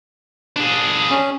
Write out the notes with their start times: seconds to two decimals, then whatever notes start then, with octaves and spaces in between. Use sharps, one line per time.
0.57 D4 G#4
1.11 C#4